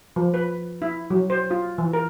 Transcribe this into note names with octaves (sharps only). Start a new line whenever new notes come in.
F3
B4
E4
F#3
C5
F4
E3
A#4